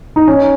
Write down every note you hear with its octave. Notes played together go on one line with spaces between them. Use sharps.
D#4
C#4